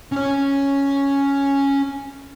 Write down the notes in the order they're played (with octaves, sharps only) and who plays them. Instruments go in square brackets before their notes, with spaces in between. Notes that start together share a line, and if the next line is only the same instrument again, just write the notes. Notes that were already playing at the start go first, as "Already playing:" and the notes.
[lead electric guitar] C#4 C#5